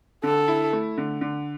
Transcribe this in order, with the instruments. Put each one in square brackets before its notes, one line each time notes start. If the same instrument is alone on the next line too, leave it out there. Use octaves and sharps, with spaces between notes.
[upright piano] D3 [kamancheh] A4
[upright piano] E4
A3
D3
D3